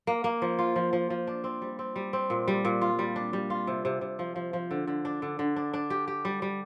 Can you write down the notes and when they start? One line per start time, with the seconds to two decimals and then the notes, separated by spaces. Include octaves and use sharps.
0.07 A#3
0.24 A#3
0.42 F3
0.59 F4
0.76 F3
0.93 F3
1.10 F3
1.27 D4
1.44 C4
1.62 G3
1.79 C4
1.96 G3
2.13 C4
2.30 A#2
2.48 G3
2.65 A#2
2.81 F4
2.99 G3
3.16 D4
3.33 G3
3.50 F4
3.67 C3
3.85 C3
4.01 C3
4.19 F3
4.36 F3
4.53 F3
4.71 D3
4.87 D3
5.05 D4
5.22 D3
5.39 D3
5.56 D4
5.74 D4
5.90 G4
6.08 G4
6.25 G3
6.42 G3